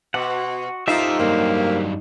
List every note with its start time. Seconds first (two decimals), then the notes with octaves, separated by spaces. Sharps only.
0.14 B2 F#4 F#5
0.88 D#4 F4 G4 A4 A#4 C5 E5
1.19 G2 F#3 A#3